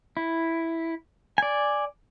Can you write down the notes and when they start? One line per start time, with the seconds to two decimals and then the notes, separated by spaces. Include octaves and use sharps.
0.17 E4
1.38 D5 G#5